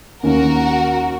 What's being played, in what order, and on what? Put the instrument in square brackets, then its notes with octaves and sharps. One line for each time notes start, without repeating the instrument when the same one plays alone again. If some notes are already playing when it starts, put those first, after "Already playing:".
[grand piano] D#2 D#3 A#3 C#4 [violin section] F#4 A#4